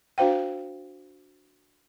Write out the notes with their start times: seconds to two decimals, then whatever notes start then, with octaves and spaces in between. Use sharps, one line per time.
0.18 D4 F#4 C5 F5 G5